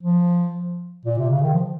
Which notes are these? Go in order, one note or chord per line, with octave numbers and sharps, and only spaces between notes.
F3
A#2
C3
C#3
D#3
F3